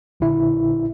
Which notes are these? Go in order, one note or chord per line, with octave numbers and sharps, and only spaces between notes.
A#1 A#2 D3 E4 E5